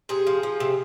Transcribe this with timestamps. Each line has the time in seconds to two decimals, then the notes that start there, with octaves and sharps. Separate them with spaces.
0.09 C3 G#4
0.27 F3
0.43 F3
0.60 C3